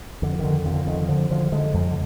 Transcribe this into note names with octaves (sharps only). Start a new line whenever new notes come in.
F2 D3
D#3
D3
F2
D3
D3 D#3
D3 F3
D3 F3
D3 G#3
F2
D3